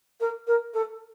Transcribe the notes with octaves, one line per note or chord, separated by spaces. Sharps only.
A#4
A#4
A4